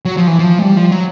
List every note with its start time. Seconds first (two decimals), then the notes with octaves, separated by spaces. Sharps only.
0.05 F#3
0.17 F3
0.27 E3
0.39 F3
0.58 G#3
0.62 G3
0.77 F3
0.91 F#3